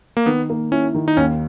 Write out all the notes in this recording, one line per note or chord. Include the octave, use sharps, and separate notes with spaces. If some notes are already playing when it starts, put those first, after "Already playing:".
A#3
D#3 B3
A#3
C#4 E4
D#3
D#4
D#2 C#4